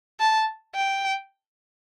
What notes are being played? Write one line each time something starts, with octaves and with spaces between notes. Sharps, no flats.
A5
G5